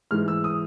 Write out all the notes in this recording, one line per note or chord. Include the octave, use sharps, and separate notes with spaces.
G#2 E3 G#3 F6
E6
D#6